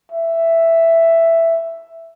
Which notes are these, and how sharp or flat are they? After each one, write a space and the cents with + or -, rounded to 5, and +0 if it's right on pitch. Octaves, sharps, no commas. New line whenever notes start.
E5 +5